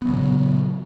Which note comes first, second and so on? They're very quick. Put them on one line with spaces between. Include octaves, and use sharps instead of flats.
B3 F#3 C#3 A#2